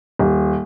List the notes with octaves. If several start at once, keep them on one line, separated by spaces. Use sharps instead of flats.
D#1